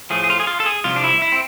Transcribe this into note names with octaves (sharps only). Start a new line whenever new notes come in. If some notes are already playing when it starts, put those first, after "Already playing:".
A2 F3 A3 G#4
G#4
F4
G#4
F4
A4
G#4
C2 C3 F3 F4
D4
E4
E4
C4